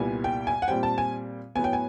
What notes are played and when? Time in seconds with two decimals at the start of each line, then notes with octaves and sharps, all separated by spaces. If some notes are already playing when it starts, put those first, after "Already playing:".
Already playing: C2 A#2 G3 B3 G#5
0.24 G5
0.47 G#5
0.62 F#5
0.68 A#2 G3 C4 G5
0.83 A5
0.98 G#5
1.55 A2 F#3 B3 G#5
1.64 G5
1.73 G#5